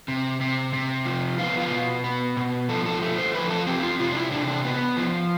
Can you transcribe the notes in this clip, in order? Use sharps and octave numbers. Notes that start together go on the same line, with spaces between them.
C3
C3
C3
F3
B3 F4
F4
B2
B3
B2
F3 A4
A4
A3
C5
F3 B4
A4
C4 G4
F4
C3 F4
D4
E4
C3 D4
D4
B3
F3